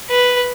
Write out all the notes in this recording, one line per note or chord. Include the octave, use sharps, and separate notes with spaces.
B4